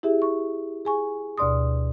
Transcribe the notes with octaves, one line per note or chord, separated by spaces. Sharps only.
E4 G4 G#4 E5
C#6
G#4 G#5 C#6
D2 B2 D5 C6 D#6